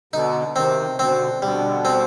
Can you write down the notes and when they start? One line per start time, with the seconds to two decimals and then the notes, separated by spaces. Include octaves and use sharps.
0.13 B2 D3 D#4
0.56 C3 D#3 C4
0.99 B2 D3 C4
1.42 B2 D3 G3
1.85 C4